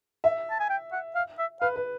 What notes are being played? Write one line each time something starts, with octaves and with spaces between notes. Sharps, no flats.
E5
A5
G#5
G5
F#5
F5
E5
B4 F5
B4